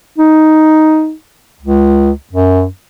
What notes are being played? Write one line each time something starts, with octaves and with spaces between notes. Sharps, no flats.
D#4
C#2
F#2